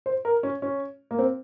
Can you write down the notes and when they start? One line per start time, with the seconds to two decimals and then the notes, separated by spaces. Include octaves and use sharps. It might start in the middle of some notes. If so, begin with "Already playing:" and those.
0.06 C5
0.25 A#4
0.43 C#4
0.62 C#4
1.11 A#3
1.19 C4